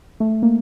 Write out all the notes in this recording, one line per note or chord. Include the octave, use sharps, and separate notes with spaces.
A3
A#3